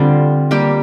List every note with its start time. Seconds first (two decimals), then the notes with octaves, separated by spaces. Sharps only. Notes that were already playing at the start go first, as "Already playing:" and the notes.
Already playing: D3 G3 C4 F4
0.51 G3 A#3 G4